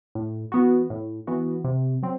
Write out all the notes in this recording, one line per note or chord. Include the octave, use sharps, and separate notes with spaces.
A2
E3 B3 F#4
A2
E3 B3 F#4
C3
F#3 C4